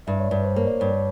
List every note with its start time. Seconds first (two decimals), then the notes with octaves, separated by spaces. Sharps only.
0.07 G2 E5
0.19 C#5
0.31 G2 B4
0.44 C5
0.56 A#3 C#5
0.67 D5
0.80 G2 C#5